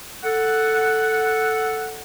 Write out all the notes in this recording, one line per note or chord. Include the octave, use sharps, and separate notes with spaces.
A4 F#5